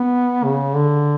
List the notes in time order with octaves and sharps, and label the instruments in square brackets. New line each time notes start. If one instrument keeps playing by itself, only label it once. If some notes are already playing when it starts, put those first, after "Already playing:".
Already playing: [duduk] B3
C#3
D3